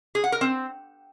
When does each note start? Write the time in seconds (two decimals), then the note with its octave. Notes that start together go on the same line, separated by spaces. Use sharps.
0.15 G#4
0.24 F#5
0.32 A#4
0.41 C4